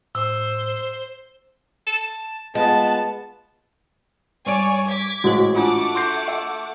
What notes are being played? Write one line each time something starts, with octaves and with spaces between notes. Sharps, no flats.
A2 C5 E6
A5
G#3 B3 F4 A5
G2 C#5 D5 G#5 C#6 D7
D6 G#6 B6
A1 G#2 E3 F#4 G#4 C5
A3 D4 F4 A4 F#5 D6
C6 G6 C7
E5